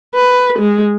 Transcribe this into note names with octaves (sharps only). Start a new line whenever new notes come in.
B4
G#3